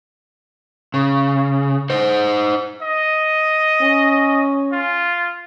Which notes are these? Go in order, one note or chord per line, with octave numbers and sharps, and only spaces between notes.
C#3
D#4 C5
D#5
C#4
F4